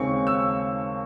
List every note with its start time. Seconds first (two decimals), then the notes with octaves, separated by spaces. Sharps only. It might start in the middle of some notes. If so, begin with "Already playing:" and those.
Already playing: D#2 C#3 G#3 C4 C#6
0.27 E6